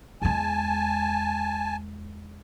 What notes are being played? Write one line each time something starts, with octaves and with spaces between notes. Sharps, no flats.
E2 G#3 G#5 A5